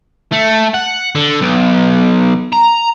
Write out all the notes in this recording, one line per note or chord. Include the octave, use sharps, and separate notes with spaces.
A3
F#5
D3
B1
A#5